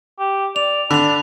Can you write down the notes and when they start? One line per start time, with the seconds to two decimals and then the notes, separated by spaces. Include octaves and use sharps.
0.19 G4
0.56 D5 F7
0.91 D3 D4 B5 F7